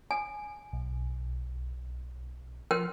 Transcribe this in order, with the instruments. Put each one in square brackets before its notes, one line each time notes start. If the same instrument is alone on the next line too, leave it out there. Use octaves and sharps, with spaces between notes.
[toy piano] G#5
[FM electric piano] B1
[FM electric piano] F3 C6 F6 [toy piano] A#4 G5